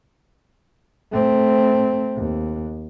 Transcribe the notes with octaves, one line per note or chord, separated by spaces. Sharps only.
A3 C4
D#2